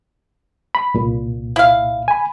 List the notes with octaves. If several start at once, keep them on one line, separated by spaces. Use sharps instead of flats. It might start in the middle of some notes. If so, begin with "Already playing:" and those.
B5
C2 A#2
E4 F5
G#5 B5